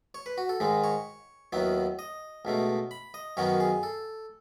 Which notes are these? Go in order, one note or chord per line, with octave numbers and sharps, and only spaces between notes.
C#5
B4
F#4
A4
G#2 D#3 G#3 D#4
C#5
D#2 D#3 F#3 B3 E4
D#5
C#2 B2 A3 D#4
B5
D#5
F#2 D#3 F#3 B3 D#4 C#5
G#4
A4